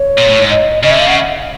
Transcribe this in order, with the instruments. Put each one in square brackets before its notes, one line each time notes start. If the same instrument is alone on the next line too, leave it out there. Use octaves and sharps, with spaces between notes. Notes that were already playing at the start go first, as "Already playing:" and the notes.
Already playing: [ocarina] C#5
[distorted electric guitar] A#2
A2
G#2
[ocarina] D#5
[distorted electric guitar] C#3 [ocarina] D#5
[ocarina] E5
[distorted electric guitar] D3
[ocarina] F5
[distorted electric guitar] C#3 [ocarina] F#5